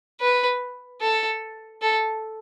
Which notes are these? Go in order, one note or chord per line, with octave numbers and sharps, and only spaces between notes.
B4
A4
A4